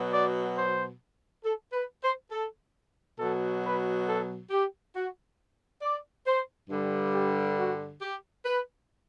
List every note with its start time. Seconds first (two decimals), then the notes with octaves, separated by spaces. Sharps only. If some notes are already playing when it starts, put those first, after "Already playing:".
Already playing: B2 F#3
0.12 D5
0.56 C5
1.43 A4
1.73 B4
2.02 C5
2.31 A4
3.19 B2 F#3 A4
3.63 B4
4.06 A4
4.50 G4
4.94 F#4
5.82 D5
6.26 C5
6.70 G2 D3 G3
7.14 G4
7.58 F#4
8.02 G4
8.45 B4